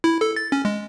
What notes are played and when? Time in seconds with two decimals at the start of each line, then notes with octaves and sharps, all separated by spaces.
0.04 E4
0.21 A4
0.36 A6
0.52 C#4
0.65 G#3